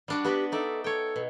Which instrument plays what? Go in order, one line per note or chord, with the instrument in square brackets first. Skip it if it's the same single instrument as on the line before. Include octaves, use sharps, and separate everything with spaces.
[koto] G3 D4 F#4
[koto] B3 F#4 B4 [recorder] G4
[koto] D#4 D5 E5 [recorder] A4
[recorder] A4 [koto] C#5 G5
[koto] B2